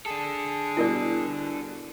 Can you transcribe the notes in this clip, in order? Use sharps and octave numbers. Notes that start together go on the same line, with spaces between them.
D4 G#4 A4
B2 G3 B3 E4 A#4 D5